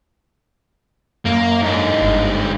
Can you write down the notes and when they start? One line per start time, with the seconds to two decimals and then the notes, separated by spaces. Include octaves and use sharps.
1.25 F#2 A#3
1.61 G#2 D4
2.02 G1